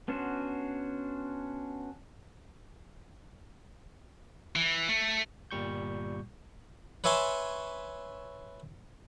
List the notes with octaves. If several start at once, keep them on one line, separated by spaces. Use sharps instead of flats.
B3 C#4 D4 F#4 C5
E3
A3
G1 A#2 G3 C#6 G6
B4 C#5 E5 G#5 A5 C6